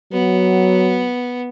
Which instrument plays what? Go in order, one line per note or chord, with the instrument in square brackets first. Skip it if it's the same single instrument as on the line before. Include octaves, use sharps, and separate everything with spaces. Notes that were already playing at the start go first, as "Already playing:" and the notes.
[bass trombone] F#3 [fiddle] B3